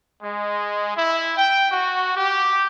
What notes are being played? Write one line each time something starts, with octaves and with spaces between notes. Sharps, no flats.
G#3
E4
G5
F#4
G4